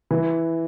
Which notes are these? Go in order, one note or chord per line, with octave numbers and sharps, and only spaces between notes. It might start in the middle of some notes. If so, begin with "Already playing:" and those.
E3